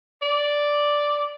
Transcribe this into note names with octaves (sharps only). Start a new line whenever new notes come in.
D5